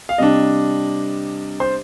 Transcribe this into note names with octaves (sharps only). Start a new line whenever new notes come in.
F5
C3 G3 D4 D#5
C5